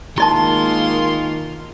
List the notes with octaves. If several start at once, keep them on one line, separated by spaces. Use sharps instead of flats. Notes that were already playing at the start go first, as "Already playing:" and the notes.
D#3 G#3 A#3 E4 F4 D#5 A5 C6